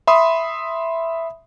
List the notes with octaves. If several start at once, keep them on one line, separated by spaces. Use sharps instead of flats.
E5 B5 C6 D#6